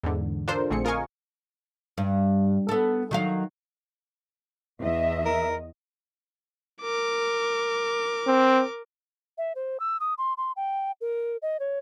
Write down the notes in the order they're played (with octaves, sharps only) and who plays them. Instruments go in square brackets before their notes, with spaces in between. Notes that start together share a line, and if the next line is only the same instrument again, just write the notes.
[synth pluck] E2 G#2 D3
D4 F4 A4 A#4 C5
A#1 D3 A3 C4 G#4 C#7
F4 A#4 D#5 F5 G#5 C#6
[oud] G2
B3 A4
D#3 F#3 F5
[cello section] E2 D#5 [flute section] E5
[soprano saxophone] A#4
[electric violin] A#4 D6
[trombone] C4
[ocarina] E5
C5
E6
D#6
C6
C6
G5
A#4
D#5
C#5